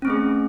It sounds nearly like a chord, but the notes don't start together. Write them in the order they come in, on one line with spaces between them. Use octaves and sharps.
C#4 C4 A3 G#4